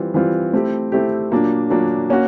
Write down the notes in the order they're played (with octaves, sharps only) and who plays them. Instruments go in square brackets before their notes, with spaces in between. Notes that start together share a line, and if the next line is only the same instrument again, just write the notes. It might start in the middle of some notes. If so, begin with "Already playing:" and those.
Already playing: [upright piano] E3 G3 C4 F4
E3 G3 C4 F4
A3 C4 E4 G4
A3 C4 E4 G4
A#2 F#3 A#3 D4
A#2 F#3 A#3 D4
A#3 C#4 F#4